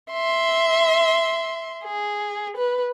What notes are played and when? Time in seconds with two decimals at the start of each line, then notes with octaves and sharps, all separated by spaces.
0.11 E5 C6
1.84 G#4
2.57 B4